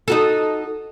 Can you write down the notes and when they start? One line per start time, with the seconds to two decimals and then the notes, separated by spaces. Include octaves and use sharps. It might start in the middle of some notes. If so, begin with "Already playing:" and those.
0.08 D#4 F#4 A4